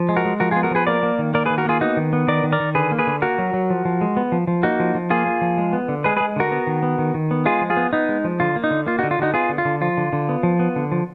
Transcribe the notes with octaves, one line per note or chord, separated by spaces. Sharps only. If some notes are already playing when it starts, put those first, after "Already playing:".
Already playing: F3
G#3
F#4 A#4
G#3
F3 F#4 A#4
F4 G#4
B3
F#4 A#4
F3 G#4 B4
A#3 A#4 D5
A#3
D#3
A#3 A#4 D5
G#4 B4
D#3
F#4 A#4
A#3 F4 G#4
B3 D#4 F#4
D#3
B3
D#3 A#4 D5
D#3
A#4 D5
D#3
D3 G#4 B4
A#3
G#4 B4
D3
A#3 F#4 A#4
F#3
F#3
F3
F3
G#3
B3
F3
F3
A#3 D#4 F#4
F3
F3
A#3 F4 G#4
A#3
F3
G#3
B3
D3
G#3 G#4 B4
G#4 B4
G#3
D3 F#4 A#4
B3
D#3
B3
D#3
D#3
B3
G#3 F4 G#4
F3
F4 G#4
B3
B3 D#4
G#3
F3
D3 F4
A#3
D#4
D3
A#3 F4
D#4 F#4
D3
F4
D3 D#4 F#4
B3 F4 G#4
D3
F4
D3
F3 F4
D3
D3
B3
F3
B3
D3
F3